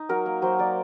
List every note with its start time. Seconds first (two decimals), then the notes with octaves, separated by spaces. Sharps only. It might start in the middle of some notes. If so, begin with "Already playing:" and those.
Already playing: D#4
0.09 F#3 A#4
0.26 A#3
0.42 F#3 C5
0.59 A#3 D5